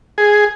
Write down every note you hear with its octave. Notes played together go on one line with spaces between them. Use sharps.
G#4